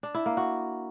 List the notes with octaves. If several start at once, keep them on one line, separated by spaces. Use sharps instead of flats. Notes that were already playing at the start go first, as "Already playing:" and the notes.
D4
E4
A#3
F#4